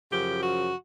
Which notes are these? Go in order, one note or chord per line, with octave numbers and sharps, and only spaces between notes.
F#2 C#3 F3 G4
F#4